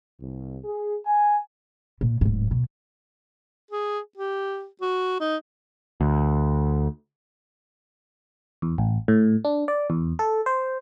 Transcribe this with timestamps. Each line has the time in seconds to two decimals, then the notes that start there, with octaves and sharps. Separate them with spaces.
0.20 C2
0.65 G#4
1.04 G#5
2.01 A#2
2.21 D1 G#2
2.51 B2
3.71 G#4
4.17 G4
4.81 F#4
5.20 D#4
6.01 D2
8.62 E2
8.78 A1
9.08 A2
9.45 D4
9.68 D5
9.90 E2
10.19 A4
10.46 C5